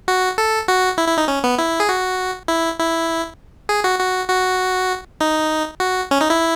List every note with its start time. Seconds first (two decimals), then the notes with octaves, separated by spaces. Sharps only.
0.08 F#4
0.38 A4
0.68 F#4
0.98 E4
1.08 E4
1.18 D#4
1.28 C#4
1.44 B3
1.58 E4
1.80 G#4
1.89 F#4
2.48 E4
2.79 E4
3.69 G#4
3.84 F#4
4.00 F#4
4.29 F#4
5.21 D#4
5.80 F#4
6.11 C#4
6.21 D#4
6.30 E4